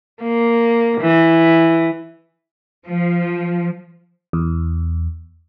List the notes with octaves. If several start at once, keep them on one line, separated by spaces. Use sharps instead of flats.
A#3
E3
F3
E2